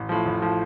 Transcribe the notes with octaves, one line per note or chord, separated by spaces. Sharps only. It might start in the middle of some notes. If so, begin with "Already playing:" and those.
Already playing: A1
A2 F3
A1
A2 F3